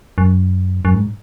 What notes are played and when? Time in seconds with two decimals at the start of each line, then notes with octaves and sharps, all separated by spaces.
0.18 F#2
0.85 F#2
0.95 G#2